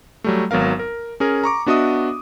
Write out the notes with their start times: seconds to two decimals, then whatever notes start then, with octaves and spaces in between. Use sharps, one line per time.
0.24 F#3 G3 A3
0.51 G#1 F#3 B3 A#4 F5
0.79 A#4
1.20 C#4 G#4 A#4
1.44 A#5 C#6 D6
1.66 B3 D4 F#4 D#5 E5 D#6